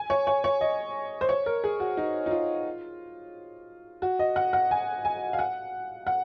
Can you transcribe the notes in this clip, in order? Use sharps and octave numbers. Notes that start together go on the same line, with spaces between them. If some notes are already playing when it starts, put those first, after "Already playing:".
Already playing: G#5
C#5
C#5
C#5
D#5
C5
C#5
A#4
G#4
F#4
D#4
D#4
F4
F#4
D#5
F#5
F#5
G#5
G#5
F5
F#5
F#5